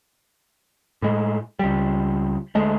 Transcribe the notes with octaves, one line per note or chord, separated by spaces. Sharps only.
A2 G#3
C#2 G3
D2 G#3 A3